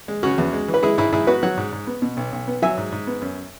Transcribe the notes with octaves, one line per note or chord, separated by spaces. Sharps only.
G#3
C#3 C#4 F#4
E2
G#3
E3
B4
G#3 E4 G#4
G#2 E4 G#4
G#2 E4 G#4
B3 F#4 B4
F#3 C#5 F#5
G#2
G#2
B3
B2
B1
B1
B3
F#3 E5 G#5
G#2
G#2
B3
F#2